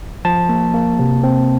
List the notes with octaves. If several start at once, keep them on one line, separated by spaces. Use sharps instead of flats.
F3 A5
A#3
A#3
C3
C4